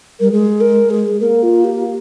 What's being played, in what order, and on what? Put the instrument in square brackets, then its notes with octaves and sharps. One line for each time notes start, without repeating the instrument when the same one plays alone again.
[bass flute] G3 [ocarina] A#4
[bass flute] G#3 [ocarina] G#4
[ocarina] A#4
G#4
[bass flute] A#3 [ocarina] A#4
[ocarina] F4
G4